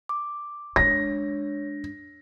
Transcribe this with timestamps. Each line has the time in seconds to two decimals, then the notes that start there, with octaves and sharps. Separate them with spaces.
0.09 D6
0.76 G#3 D4 C#5 A#6